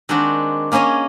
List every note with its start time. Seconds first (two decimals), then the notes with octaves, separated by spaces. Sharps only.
0.09 D#3 G#3 C4 D4 F#4
0.72 A#3 C#4 G#4 C#5 D#5